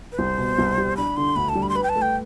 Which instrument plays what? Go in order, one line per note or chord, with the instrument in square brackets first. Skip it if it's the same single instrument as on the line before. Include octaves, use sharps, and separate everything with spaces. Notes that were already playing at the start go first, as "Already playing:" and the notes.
[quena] B4
[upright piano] C2 [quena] C5
[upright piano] B2
C2
G3
[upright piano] D4 [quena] B5
[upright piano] D3 [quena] C6
[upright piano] D2 [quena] B5
[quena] A5
[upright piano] G3
[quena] B5
C6
[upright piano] B4 [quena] B5
[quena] G5
A5
[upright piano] A3
[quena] G5